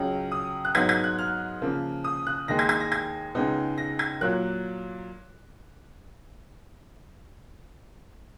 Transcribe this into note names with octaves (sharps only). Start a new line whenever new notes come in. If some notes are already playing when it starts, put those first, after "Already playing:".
Already playing: C#2 C#3 F#3
D#6
F#6
G#2 F#3 B3 D#4 G#6
G#6
F#6
F6
C#3 F3 A#3
D#6
F#6
D#2 D#3 G#3 A#6
G#6
G#6
A#6
G#6
C#2 C#3 G#3 B3 D#4
A#6
G#6
A#2 F#3 A#3 F#6